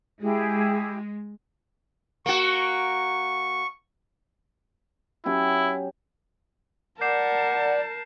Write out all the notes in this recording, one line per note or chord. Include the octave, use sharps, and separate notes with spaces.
G#3 E4 G4 G#4
A#3 F#4 C#6
F#3 C#4 E4 G4
A#4 D5 F#5 A5 G6 C7 E7